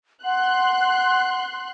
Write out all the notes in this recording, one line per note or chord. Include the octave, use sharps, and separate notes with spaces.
F#5 C6 F#6